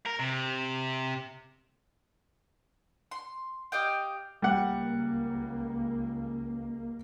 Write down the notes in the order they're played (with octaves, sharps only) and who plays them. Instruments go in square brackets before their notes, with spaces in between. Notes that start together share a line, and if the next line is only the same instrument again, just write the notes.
[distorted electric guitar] A#4
C3
[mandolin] C6
G4 D#5 F5 G5
[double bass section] C#2 A#3 [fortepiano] G3 F#5